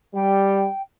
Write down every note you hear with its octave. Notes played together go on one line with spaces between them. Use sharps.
G3 G5